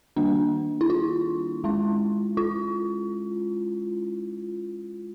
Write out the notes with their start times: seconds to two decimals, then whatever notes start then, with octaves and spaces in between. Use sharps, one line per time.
0.16 D#3 G3 A#3 D4
0.81 E4
0.90 F4
1.64 G#3 C#4 E4
2.37 F4